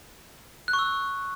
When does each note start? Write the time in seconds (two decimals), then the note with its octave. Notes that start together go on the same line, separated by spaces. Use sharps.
0.68 F#6
0.73 C#6
0.79 E6